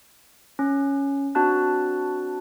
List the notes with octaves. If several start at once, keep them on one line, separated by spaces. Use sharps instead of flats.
C#4
C4 D4 F#4 A5 F#6